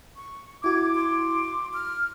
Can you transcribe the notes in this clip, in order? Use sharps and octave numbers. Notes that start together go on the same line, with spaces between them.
C#6
E4 F#4 D6 G#6
C6
F6